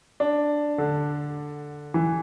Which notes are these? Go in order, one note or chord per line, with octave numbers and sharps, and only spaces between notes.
D4
D3
E3